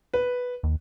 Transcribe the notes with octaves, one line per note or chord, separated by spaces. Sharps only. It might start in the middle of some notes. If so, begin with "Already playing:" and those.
B4
D#2